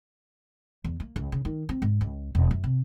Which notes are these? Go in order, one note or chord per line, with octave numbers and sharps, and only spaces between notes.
E2
A#3
C#2
C#3
D#3
C4
G#2
C#2
E1
F#2
C3